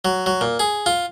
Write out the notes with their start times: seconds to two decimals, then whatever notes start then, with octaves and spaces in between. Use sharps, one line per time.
0.05 F#3
0.26 F#3
0.41 A#2
0.59 G#4
0.86 F4